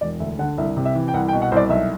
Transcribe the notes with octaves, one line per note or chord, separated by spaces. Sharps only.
E1 D5
D2 E5
D3 F#5
C2 E5
C3
E5
E3
G5
C2 F#5
G5
B2
F#5
C2 C5 D5
B1 E5